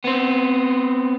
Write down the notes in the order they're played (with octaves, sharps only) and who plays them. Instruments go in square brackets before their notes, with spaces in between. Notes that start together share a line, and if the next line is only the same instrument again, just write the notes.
[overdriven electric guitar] B3 C4